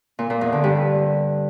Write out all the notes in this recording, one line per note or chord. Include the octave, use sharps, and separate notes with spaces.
A#2
A#2
E2
D3
G2